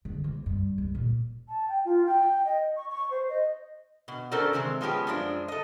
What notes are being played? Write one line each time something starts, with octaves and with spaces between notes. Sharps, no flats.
D3
C#3 A#3
G2
C#2
A#2 A#3
A5
G5
F4
G5
D#5
C#6
C#6
C5
D#5
B2
C#4 F#4 A4 A#4 C5 D5
C3 D#3 G#3 C4
F3 G#3 B3 C#4 G4
F#2 F3 G#3 D4
A4 D#5